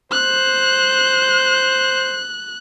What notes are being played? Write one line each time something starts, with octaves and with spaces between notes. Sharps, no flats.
C5 F#6